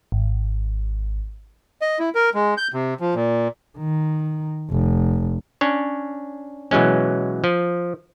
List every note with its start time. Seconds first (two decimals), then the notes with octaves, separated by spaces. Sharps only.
0.12 G#1
1.82 D#5
1.99 E4
2.15 A#4
2.34 G#3
2.57 G6
2.73 C3
3.00 F3
3.15 A#2
3.78 D#3
4.71 F1
5.61 C#4 D4 C#5
6.71 B2 E3 F#3 G#3 C#4
7.44 F3